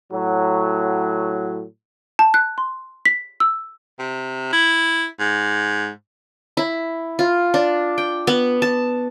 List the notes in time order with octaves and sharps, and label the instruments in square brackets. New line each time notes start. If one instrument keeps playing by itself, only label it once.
[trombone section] A2 F#3
[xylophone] A5
F#6
C6
B6
E6
[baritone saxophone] C3
E4
G#2
[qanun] E4
F4
D4
G5
B3
A5